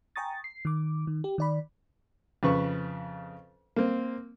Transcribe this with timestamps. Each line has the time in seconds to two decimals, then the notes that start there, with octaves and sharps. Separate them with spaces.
0.16 G5 G#5 A#5 C#6 D#6 A6
0.44 C7
0.65 D#3 D6
1.07 D#3
1.24 G4
1.38 D#3 D5 B5
2.43 F2 C#3 B4 C#6
3.76 A#3 C4